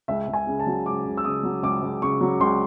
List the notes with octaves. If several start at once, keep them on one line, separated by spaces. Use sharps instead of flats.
C#2 E5
C#2
G#5
C#3
A5
F#3
C#2 D6
C#2
E6
C#3 D#6
F#3
C#2 D6
C#2
C#3 C#6
F#3
C#2 C6